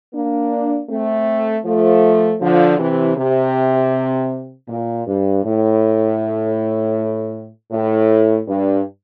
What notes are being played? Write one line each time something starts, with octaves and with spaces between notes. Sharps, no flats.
A#3 D4
A3 C4
F3 A3
D3 F3
C3 E3
C3
A#2
G2
A2
A2
G2